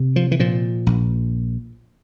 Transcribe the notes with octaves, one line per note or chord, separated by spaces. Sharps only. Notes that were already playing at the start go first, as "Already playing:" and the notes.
Already playing: C3
F3
E3
A#2 F3
A#1